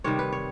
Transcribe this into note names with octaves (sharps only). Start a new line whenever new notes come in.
C3 D#3 G3 C#5
B4
C#5